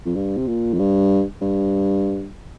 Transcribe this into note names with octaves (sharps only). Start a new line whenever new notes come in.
F2
G2
C3
A#2
F2
G2
G2